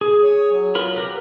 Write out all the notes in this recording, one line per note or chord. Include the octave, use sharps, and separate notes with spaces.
G#4
C#5
F#3
F4 A#4 B5
G4 A#4 B4